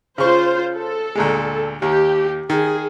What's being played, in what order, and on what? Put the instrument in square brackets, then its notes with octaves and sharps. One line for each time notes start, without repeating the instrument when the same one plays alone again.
[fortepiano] C#3 C#6 [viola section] F4 C5
[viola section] A4
[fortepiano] D2 A#2 G#3
[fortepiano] D#2 [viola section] G4
[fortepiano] D#3 [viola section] G#4